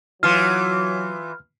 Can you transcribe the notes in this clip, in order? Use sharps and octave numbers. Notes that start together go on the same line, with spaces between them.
E3 F#3 F4 F6